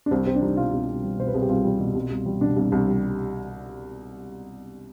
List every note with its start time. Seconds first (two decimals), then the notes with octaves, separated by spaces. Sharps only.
0.06 D4
0.11 C2 C4
0.26 C2 C4
0.35 D4
0.42 G3 D#4
0.57 B2 F4
0.73 C2
0.88 C2
1.04 G3
1.19 B2 C5
1.27 B4
1.34 C2 G#4
1.42 G4
1.49 C2 F4
1.65 G3
1.79 B2
1.95 C2
2.11 C2
2.26 G3
2.41 B2 D4
2.56 C2
2.72 C2
2.87 G3